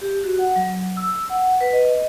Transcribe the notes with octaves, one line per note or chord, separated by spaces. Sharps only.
G4
F#4
F#5
F#3
E6
F#5
B4
D#5
D#5